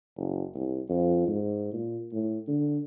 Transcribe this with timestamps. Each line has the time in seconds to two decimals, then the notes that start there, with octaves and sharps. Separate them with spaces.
0.17 F#1
0.55 C2
0.89 F2
1.28 G#2
1.73 A#2
2.13 A2
2.48 D3